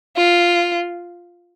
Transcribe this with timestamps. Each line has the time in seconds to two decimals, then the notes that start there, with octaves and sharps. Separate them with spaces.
0.17 F4